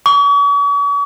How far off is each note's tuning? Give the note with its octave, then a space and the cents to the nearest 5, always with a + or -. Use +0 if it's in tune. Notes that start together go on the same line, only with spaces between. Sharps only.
C#6 +45